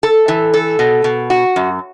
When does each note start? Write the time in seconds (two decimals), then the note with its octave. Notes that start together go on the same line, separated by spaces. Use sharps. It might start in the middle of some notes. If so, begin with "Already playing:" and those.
0.03 A4
0.28 E3
0.54 A4
0.79 B2
1.04 B2
1.30 F#4
1.56 F#2